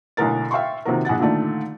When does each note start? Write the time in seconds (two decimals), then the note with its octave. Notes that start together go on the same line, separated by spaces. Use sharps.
0.17 B1 A2 D3 A#4 A6
0.51 E5 F5 G5 C6 C#6
0.85 C3 D#3 F3 F#4 A#4
1.05 A#1 E4 F#5 A6
1.19 A#2 D3 D#3 A3 D4